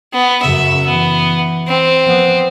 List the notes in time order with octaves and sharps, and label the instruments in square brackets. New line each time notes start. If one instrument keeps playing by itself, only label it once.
[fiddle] B3
[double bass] F#2 C#3 [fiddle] E5
[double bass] E3 [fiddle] B3
[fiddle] C4
[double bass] F3 B3